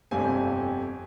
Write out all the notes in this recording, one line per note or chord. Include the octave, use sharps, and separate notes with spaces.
G1 F2 C3 G3 C4 G#5